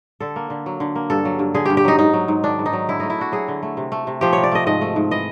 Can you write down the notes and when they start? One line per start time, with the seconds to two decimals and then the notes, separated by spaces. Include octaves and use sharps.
0.20 D3 A4
0.36 A#3
0.50 D3
0.66 F#3
0.80 D3
0.95 A#3
1.10 G2 A4
1.25 F#3
1.39 G2
1.55 D3 G#4
1.66 G2 G4
1.77 G4
1.85 F#3 D#4
1.99 G#2 D#4
2.13 F#3
2.28 G#2
2.44 D#3 D4
2.59 G#2
2.66 D#4
2.73 F#3
2.89 D3 E4
3.00 A3 D#4
3.10 E4
3.18 D4 F#4
3.32 F#3 G#4
3.48 D3
3.63 A3
3.77 C3
3.92 A3
4.07 C3
4.21 F3 G4
4.33 C3 C#5
4.44 D5
4.51 A3 D#5
4.66 G#2 D#5
4.81 A3
4.96 G#2
5.11 E3 D#5